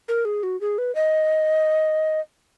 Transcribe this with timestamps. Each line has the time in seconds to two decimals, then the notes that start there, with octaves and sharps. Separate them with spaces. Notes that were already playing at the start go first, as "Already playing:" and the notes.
0.08 A#4
0.25 G#4
0.43 F#4
0.61 G#4
0.78 B4
0.95 D#5